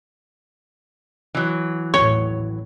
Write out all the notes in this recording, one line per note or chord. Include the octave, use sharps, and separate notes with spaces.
E3 F#3
A1 D#2 A2 C#5 C#6